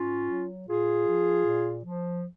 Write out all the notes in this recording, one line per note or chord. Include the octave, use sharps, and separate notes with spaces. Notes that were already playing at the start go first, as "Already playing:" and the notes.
Already playing: G#2 C#4 F4
F#3
A#2 F4 G#4
F3
A#2
F3